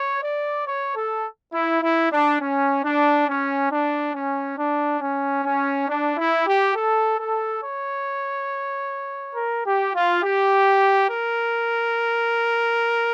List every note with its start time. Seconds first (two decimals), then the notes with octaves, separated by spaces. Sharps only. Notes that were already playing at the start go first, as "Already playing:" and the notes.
Already playing: C#5
0.23 D5
0.66 C#5
0.95 A4
1.53 E4
1.82 E4
2.11 D4
2.41 C#4
2.84 D4
3.28 C#4
3.71 D4
4.14 C#4
4.58 D4
5.01 C#4
5.45 C#4
5.88 D4
6.17 E4
6.47 G4
6.75 A4
7.19 A4
7.63 C#5
9.35 A#4
9.65 G4
9.94 F4
10.23 G4
11.10 A#4